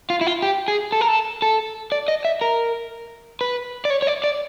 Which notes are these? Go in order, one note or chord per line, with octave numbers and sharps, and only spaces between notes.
F4
E4
F4
G4
G#4
A4
A#4
A4
A4
D5
D#5
E5
A#4
B4
D5
C#5
C#5
D5
D5